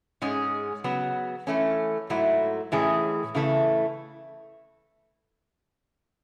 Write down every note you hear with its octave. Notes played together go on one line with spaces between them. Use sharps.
G#2 G#3 C#4 G#4
C#3 F#3 B3
E3 A3 C#4
G#2 F#3 A3 E4
A2 E3 G#3 C#4 G#4
C#3 E3 A3 E4